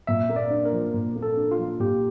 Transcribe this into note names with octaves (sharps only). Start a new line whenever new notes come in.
A#2 E5
A#3
D5
D4
A#4
F3
A#2
A#3
A4
D4
F4
F3
A#2 G4